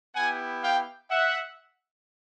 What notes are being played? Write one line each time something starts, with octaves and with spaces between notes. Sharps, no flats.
B3 E4 G4 F#5 G#5
F5 G5
E5 F#5